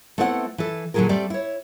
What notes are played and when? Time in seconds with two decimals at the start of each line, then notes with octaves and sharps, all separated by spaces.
0.18 A3 B3 C4 E4 D5 F#5
0.58 E3 A4
0.94 A#2 D3 F#3 G#3 G#4 A#4
1.09 G3 A3 C4 D5
1.30 E4 C#5